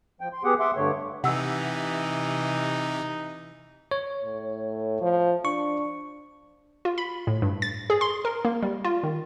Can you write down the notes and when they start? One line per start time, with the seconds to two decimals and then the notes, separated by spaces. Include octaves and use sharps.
0.21 F3 G5
0.33 C6
0.44 B3 G4 G#4 F#5
0.60 E5 F#5 C6 D6
0.76 G2 D3 A3 C#5
1.24 C3 E3 D#4 F#5 E6
3.91 C#5
4.23 A2
5.02 F3
5.45 D4 C#6
6.85 F4
6.98 B5
7.27 A2
7.42 G2
7.62 A6
7.90 G#4
8.01 C6
8.25 A#4
8.45 A#3
8.63 G3
8.85 F4
9.03 D#3